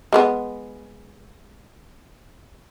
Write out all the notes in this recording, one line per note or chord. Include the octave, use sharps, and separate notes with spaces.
G#3 A3 B3